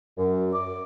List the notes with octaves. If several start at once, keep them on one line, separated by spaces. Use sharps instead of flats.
F#2
D6